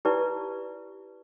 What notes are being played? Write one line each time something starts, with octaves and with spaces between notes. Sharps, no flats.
E4 G4 B4 D5 A5